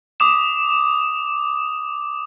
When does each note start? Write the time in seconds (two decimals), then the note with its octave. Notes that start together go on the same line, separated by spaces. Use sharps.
0.20 D6 D#6 E7